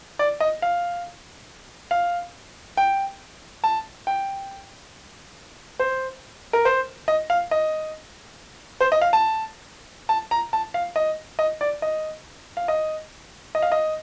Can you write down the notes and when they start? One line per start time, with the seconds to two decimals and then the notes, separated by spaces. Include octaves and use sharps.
0.19 D5
0.40 D#5
0.62 F5
1.91 F5
2.77 G5
3.64 A5
4.07 G5
5.80 C5
6.53 A#4
6.65 C5
7.08 D#5
7.30 F5
7.51 D#5
8.81 C5
8.92 D#5
9.01 F5
9.13 A5
10.09 A5
10.31 A#5
10.53 A5
10.74 F5
10.96 D#5
11.39 D#5
11.61 D5
11.82 D#5
12.57 F5
12.68 D#5
13.55 D#5
13.62 F5
13.72 D#5